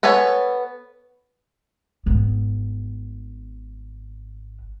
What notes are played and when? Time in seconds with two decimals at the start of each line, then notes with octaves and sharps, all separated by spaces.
0.03 B3 A4 B4 C#5 G#5
2.06 G#1 B3